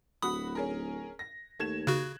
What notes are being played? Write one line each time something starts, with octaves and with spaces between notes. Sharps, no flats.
D1 F#4 B5 D#6
C#4 G#4 A#4
A#6
D#2 A3 G#6 E7
C#3 F#4 F#6